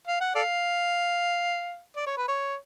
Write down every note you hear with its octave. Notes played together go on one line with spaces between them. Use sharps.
F5
F#5
A4 D5 F5
D5
C#5
B4
C#5